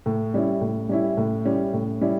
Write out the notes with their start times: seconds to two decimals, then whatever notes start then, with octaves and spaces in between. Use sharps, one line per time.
0.06 A2
0.34 G3 C#4 E4
0.61 A2
0.89 G3 C#4 E4
1.17 A2
1.45 G3 C#4 E4
1.73 A2
2.01 G3 C#4 E4